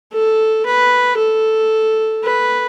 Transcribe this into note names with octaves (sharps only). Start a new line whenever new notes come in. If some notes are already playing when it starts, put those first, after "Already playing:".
A4
B4
A4
B4